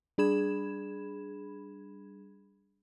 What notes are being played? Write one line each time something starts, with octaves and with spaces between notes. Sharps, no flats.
G3 D4 G#4 B5 G#6 E7